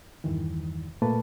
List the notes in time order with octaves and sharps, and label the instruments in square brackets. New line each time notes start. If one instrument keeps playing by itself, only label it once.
[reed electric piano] E2 G2 D#3 E3
A#2 A3 A#3 B4 A5